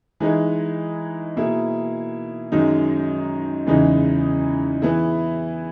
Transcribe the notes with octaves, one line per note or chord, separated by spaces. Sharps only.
E3 G#3 D#4 G#4
B2 A#3 E4 G#4
F#2 D#3 G#3 D#4
E2 C#3 E3 G#3 D#4
E3 B3 E4 G#4